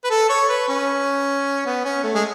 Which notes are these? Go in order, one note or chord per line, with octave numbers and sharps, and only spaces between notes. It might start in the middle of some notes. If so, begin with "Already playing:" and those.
B4
A4
C#5
B4
C#4
B3
C#4
A3
G#3